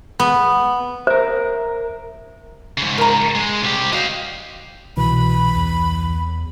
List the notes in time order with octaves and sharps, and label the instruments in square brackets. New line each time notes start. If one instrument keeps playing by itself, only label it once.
[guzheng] B3
[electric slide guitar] A#4 E5 [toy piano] C5
[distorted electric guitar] G#2 C#3
[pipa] A#4 A#5
[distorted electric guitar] G#3
C2 G4
[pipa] F#4 D5 G5 [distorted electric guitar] D#5 F5
[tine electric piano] C2 E3 [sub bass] B2 [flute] B5
[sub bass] E2